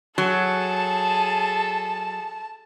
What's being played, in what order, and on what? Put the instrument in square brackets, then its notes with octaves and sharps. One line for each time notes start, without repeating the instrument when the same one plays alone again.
[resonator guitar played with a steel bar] F#3 [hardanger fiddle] G#4 A4 [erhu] A5